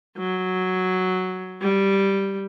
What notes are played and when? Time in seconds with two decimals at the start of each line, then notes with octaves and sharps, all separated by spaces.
0.17 F#3
1.62 G3